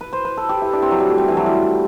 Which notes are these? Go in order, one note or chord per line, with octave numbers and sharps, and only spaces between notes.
B4
C5
B4
A4
G4
E4
D4
C4
F#3
G3
A3
G3
E3
F#3
G3